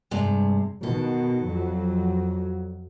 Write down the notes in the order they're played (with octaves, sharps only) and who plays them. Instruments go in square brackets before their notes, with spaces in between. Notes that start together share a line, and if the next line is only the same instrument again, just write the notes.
[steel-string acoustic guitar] G2 C3 G#3
[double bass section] B2 D#3 [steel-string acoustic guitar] A4
[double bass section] F2 F#3